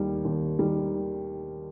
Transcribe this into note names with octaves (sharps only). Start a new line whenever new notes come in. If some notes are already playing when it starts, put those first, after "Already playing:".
Already playing: D#2 D#3 G3
D#2
D#3 G3